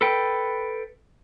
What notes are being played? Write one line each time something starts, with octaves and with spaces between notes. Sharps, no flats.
A4 B4 G5